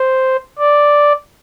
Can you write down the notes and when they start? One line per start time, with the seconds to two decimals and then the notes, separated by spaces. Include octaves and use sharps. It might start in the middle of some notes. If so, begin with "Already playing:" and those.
Already playing: C5
0.59 D5